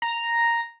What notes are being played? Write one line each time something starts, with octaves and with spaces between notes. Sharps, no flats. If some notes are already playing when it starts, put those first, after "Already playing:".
A#5